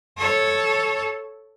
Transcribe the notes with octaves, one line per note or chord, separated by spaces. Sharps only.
A4 C#5